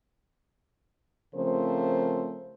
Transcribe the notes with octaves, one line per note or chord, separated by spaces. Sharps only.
C#3 F3 A3 C4 A#4 C5